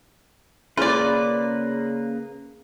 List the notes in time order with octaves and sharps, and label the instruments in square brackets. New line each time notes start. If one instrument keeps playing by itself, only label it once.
[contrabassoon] C#3 [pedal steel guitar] A#3 B4 [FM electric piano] C#4 G#4 A#5 [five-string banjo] F4 D5